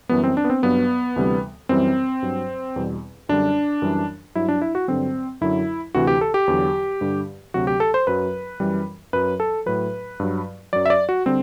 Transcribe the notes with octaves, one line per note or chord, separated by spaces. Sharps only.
F#2 E3 G3 B3
C4
D4
B3
C4
G2 F#3 B3
D2 C3 E3 G3
F#2 E3 G3 C4
G2 F#3
E2 B2 G3
F#2 D3 G3 D4
F#2 E3 G3
G2 F#3 E4
D4
E4
F#4
G2 D3 F#3 C4
F#2 D3 F#3 E4
D2 C3 E3 F#4
G4
A4
G4
E2 D3 F#3
G2 D3 G3
D2 C3 F#3 F#4
G4
A4
C5
F#2 F#3 B4
F#2 E3 G3
F#2 F#3 B4
A4
A2 F#3 B4
G2 F#3
F#2 F#3 D5
E5
D5
F#4
D3 G3 C4